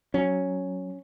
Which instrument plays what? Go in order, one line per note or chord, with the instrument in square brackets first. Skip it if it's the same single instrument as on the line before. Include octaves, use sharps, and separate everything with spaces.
[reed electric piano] F#3 [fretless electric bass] C#4